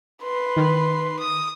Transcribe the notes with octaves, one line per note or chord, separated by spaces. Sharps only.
B4 C6
D#3
D#6